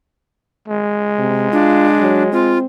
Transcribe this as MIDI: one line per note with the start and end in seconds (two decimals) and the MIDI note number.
0.68 2.66 56
1.19 1.48 48
1.52 2.23 62
1.52 1.88 65
1.99 2.29 54
2.32 2.65 60
2.32 2.58 65